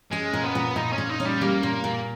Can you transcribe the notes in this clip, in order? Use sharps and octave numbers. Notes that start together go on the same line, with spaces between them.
G#3 C#4
A#2
B3
A#2
A#2 D#4
C#4
A#2
D#4
C#4
G3
G3 A#3
A#2
A#2